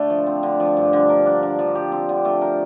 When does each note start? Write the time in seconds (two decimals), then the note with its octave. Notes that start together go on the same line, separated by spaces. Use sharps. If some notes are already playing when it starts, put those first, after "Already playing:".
Already playing: D3 A3
0.10 F3
0.27 C4
0.43 D3
0.60 F3
0.77 G2
0.93 D3
1.09 A#4
1.26 D4
1.43 D4
1.59 F3
1.75 G4
1.92 C4
2.09 D3
2.25 A3
2.42 A#4